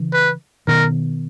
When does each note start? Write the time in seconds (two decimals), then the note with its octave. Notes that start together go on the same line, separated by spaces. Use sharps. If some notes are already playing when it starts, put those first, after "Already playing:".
Already playing: C#3 E3
0.13 B4
0.68 B2 D#3 A#4